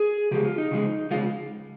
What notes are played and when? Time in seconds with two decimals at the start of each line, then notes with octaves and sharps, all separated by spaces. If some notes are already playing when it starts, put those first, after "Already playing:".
Already playing: G#4
0.31 C#3 F3 G#3 G4
0.44 F4
0.58 D#4
0.71 C#3 F3 G#3
1.11 C#3 F3 G#3 F4